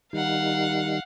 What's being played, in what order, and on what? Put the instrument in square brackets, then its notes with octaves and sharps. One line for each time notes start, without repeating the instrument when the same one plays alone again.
[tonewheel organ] D#3 G3 D#4 [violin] F5 F#5